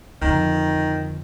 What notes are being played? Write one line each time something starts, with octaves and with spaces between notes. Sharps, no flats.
F2 D3 D#3